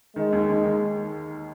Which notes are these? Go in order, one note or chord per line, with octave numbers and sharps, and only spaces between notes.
D#3 G#3
D#2
D#2
D#3